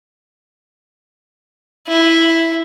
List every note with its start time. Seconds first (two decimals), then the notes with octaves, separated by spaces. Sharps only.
1.87 E4